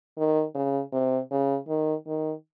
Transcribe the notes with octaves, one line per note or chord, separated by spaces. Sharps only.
D#3
C#3
C3
C#3
D#3
D#3